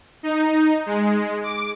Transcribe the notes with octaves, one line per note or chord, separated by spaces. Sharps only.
D#4
G#3
D6